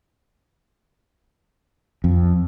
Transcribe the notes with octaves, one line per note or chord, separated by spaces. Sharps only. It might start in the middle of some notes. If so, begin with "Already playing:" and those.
F2